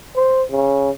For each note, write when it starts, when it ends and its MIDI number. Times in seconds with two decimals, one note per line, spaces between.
0.16 0.43 72
0.51 0.91 49